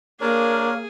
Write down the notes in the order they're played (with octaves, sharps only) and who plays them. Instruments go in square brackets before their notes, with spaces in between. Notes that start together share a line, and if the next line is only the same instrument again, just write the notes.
[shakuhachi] A#3 [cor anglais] D4 [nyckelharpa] G#4 [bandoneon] A#4 C#5